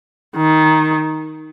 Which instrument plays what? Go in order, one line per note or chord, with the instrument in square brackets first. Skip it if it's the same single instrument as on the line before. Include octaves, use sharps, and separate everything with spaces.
[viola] D#3